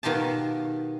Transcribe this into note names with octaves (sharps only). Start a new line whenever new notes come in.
B2 D#3 F4 G4 A5